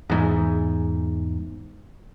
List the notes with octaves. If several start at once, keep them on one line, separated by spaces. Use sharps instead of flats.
E2 G#2